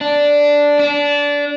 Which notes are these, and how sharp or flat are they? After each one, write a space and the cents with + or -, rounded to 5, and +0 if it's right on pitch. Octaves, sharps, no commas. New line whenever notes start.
D4 -5
D4 -20